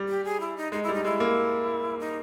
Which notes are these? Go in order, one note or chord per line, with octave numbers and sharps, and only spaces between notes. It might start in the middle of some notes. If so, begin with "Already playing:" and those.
Already playing: G3
G4
G#4
E4
D#4
G#3 D#4
E4
G3
D#4
G#3 E4
A#3
D#4